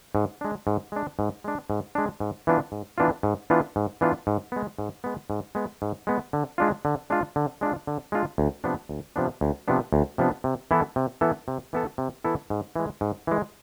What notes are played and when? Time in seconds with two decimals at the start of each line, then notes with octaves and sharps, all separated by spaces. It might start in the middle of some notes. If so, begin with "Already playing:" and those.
0.15 G#2
0.41 G#3 D4
0.67 G#2
0.92 G#3 D4
1.19 G#2
1.44 G#3 D4
1.70 G#2
1.95 G#3 D4
2.20 G#2
2.47 E3 B3 D4 F4
2.72 G#2
2.98 E3 B3 D4 F4
3.23 G#2
3.50 E3 B3 D4 F4
3.76 G#2
4.01 E3 B3 D4 F4
4.27 G#2
4.52 G#3 B3
4.78 G#2
5.04 G#3 B3
5.30 G#2
5.55 G#3 B3
5.82 G#2
6.07 G#3 B3
6.33 D3
6.58 G#3 D4 F4
6.85 D3
7.10 G#3 D4 F4
7.36 D3
7.61 G#3 D4 F4
7.87 D3
8.12 G#3 D4 F4
8.38 D2
8.64 C3 F3 B3 D4
8.89 D2
9.16 C3 F3 B3 D4
9.41 D2
9.68 C3 F3 B3 D4
9.93 D2
10.18 C3 F3 B3 D4
10.44 C3
10.71 E3 B3 E4 A4
10.96 C3
11.21 E3 B3 E4 A4
11.48 C3
11.73 E3 B3 E4 A4
11.98 C3
12.24 E3 B3 E4 A4
12.50 G#2
12.76 E3 G#3
13.01 G#2
13.27 E3 G#3